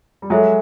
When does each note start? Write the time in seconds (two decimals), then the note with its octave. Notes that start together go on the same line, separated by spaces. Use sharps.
0.22 G3
0.30 F#3 G#3 F#4 A4 C#5 E5 G#5